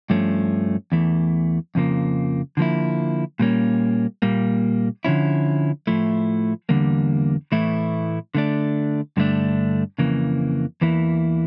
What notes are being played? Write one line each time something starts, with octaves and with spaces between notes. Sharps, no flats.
G2 F3 A3 C#4
E2 E3 A3
F2 C#3 F3 A#3
D3 F3 A#3 E4
A#2 G3 A#3 C#4
A#2 G3 A#3
D3 F3 C#4 E4
A2 F3 A3 E4
E2 D3 G3 A#3
A2 E3 A3 E4
D3 A3 D4
G2 D3 A3 D4
F2 C#3 E3 A#3
E2 E3 A#3 E4